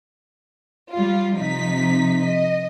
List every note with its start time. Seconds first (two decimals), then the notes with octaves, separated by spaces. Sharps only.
0.91 G3 F4
1.36 C3 F3 D#4 B6
2.25 D#5